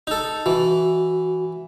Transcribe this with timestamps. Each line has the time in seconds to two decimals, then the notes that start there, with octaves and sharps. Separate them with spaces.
0.07 D#4 A4
0.46 E3 F#4